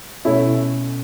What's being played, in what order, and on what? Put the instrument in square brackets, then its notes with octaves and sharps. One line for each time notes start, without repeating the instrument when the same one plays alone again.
[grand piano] B2 A3 C#4 E4 A4